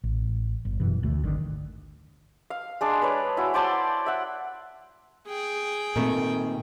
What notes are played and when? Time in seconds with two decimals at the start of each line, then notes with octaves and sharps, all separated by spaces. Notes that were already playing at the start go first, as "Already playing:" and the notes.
0.04 A1
0.65 G1
0.80 F#2 B2 E3
1.03 D2 A3
1.23 G#1 D3 D#3
2.50 F5
2.81 G#3 D4
3.02 B4 C#5 D5
3.37 E4 F#4
3.54 C5 D5 A5 C6
4.06 E5 F#5
5.27 G#4 G5
5.96 A#2 D#3 A3 C4